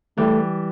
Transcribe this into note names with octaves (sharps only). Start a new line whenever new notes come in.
E3 G3 A3